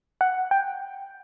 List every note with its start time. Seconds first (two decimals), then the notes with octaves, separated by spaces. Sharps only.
0.21 F#5
0.51 G5